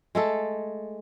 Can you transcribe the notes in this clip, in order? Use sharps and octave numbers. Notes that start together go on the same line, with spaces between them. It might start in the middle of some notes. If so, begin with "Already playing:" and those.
G#3 A3 A4